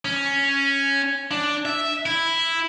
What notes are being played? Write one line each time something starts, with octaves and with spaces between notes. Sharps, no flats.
C#4
D4
E5
E4